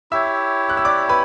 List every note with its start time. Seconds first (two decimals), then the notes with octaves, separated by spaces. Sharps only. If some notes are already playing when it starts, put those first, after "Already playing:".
0.11 E4 G4 C#5 E5 E6
0.69 F#6
0.77 E6
0.85 D5 D6
1.09 B4 B5